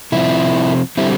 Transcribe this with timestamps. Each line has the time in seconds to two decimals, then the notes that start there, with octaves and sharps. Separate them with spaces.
0.12 C3 F3 C4 E4
0.97 D3 G3 C4 E4